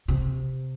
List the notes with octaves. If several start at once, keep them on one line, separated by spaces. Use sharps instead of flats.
C3